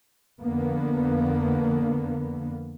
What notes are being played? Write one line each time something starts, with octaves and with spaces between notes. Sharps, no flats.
F2 D3 A#3 B3